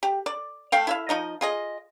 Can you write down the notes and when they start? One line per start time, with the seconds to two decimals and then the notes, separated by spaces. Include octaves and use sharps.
0.03 G4
0.26 D5
0.72 A3 F5 G5
0.87 E4 E5 F5
1.09 F3 D#4 D#5
1.41 F4 G#4 D#5